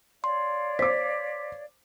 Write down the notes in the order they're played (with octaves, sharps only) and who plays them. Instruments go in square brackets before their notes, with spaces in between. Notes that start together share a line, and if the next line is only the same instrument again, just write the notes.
[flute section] C#5 D5 F5 [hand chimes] C6
[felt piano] C5 D6 [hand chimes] B6